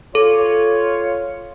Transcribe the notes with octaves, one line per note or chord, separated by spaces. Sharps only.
F4 A4 C#5